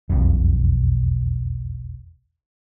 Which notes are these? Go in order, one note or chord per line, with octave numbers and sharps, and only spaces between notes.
E1 B1 F2